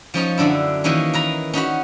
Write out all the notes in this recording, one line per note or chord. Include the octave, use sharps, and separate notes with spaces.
F3 C#4 D#4 F4
F#2 D3 D4 E4
D#3 E3 A#3 C#4
A#4 B4 A#5
C#4 D#4 F#4 B5